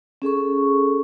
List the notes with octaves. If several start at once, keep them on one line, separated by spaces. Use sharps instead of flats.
C#4 G#4 A4 C#6